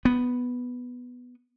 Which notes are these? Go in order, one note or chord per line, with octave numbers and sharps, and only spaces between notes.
B3